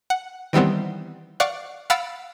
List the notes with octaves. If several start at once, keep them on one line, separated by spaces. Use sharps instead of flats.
F#5
D#3 E3 G3 B3 C4
D5 F5 F#5 C#6 F#6
F5 F#5 B5 E6 A6 D7